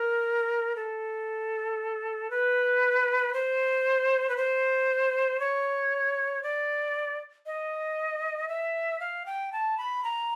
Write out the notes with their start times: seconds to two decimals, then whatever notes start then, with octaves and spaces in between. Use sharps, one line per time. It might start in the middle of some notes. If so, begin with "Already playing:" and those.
Already playing: A#4
0.76 A4
2.30 B4
3.34 C5
4.29 B4
4.37 C5
5.40 C#5
6.43 D5
7.46 D#5
8.49 E5
9.00 F5
9.26 G5
9.52 A5
9.78 B5
10.04 A#5